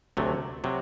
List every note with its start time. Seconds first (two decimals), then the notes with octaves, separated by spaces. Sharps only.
0.17 D2 C3 F#3 A3
0.64 C3 F#3